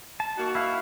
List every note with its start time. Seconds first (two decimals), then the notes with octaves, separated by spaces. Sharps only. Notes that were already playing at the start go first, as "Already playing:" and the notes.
0.20 A5
0.37 A#3 D#4 F#4
0.55 E4 F5